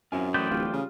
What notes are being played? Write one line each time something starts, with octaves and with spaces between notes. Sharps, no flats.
F#2 C4 E4 F4 G#5
E3 A3 C5 D5 G5 B5 D#6 F#6
D1 G3 F4
C#3